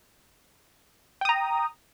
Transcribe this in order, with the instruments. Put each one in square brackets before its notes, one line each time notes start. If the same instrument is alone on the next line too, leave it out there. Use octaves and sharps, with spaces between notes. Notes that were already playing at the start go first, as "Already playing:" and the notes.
[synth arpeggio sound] G5
D#6
A#5